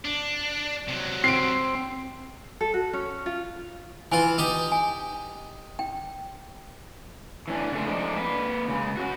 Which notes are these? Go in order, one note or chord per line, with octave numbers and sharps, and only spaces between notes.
D4
C3 F#3
C4 C7 D7
A4
F#4
C#4
F4
E3 F4 G#5
D#4 G4
G#5
G5
E3 C#4 D4
C#3 A3 F4
F3 G#3 A3 B3 D4 D#4
A#3 B4
C#3 G#3
C#4 F#4